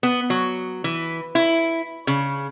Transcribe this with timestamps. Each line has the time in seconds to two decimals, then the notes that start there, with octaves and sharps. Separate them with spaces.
0.03 B3
0.30 F#3
0.84 E3
1.35 E4
2.07 C#3